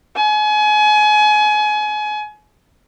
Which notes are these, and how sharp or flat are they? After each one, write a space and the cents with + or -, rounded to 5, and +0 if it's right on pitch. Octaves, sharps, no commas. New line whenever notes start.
G#5 +30